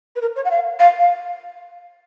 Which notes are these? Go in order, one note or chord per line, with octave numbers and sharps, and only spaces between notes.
B4
A#4
C#5
F#5
F5
F5
F5